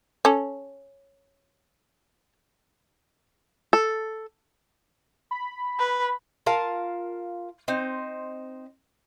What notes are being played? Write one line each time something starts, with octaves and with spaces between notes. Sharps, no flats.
C#4 A4
A4
B5
B4
F4 A#4 F5 A5
C4 D#4 C5